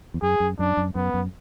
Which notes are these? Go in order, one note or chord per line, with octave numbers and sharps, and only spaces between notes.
E2
F#2 G#4
F#2
F#2 D4
F#2
F#2 B3
F#2